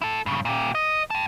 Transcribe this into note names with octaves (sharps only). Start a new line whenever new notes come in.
E4 A4
G2 C#3
A#2 G4
D#5
G5 A5